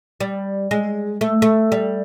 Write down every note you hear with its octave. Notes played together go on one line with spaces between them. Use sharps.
G3
G#3
A3
A3
G3